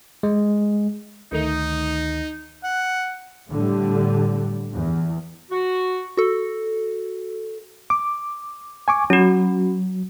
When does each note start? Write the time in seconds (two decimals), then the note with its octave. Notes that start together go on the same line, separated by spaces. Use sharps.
0.23 G#3
1.32 D2 D#3 A3 D#4
2.64 F#5
3.50 A2 D3 G3
4.73 E2
5.51 F#4
6.17 F#4 A4
7.90 D6
8.88 G#5 C#6 D6
9.10 F#3 C#4 F#4